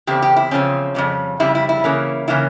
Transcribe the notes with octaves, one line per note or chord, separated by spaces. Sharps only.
E2 C#3 C4 G4
G4
E4
E2 C#3 F3 C4 C#4
F2 C#3 G3
F2 C#3 G3 E4
E4
E4
C#3 E3 A#3 C#4
C#3 E3 A#3 C#4 E4